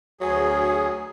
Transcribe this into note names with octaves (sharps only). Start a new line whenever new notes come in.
D2 F#3 G#4